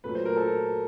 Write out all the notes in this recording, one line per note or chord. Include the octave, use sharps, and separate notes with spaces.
A#2 F#3 A3 B4
C5
A#4
A4